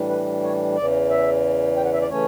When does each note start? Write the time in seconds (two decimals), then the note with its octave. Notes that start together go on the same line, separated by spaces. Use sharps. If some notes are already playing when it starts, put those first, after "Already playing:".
Already playing: A2 E3 G3 D4
0.09 B4
0.43 C#5
0.76 E2 C#3 E3 D5
1.10 E5
1.77 G5
1.85 F#5
1.93 E5
2.02 D5
2.10 C#3 E3 A3 C#4 C#5